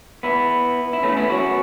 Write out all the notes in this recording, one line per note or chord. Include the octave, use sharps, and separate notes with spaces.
B3 E4
E4
A3 C#4
B3 E4
C#4 F#4